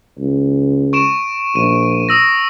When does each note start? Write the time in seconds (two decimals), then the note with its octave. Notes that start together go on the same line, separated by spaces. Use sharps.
0.19 C#2
0.93 C#6 D7 E7
1.56 A#1 D#7
2.09 D#6 E6 A#6